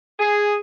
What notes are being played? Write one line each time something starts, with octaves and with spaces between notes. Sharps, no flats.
G#4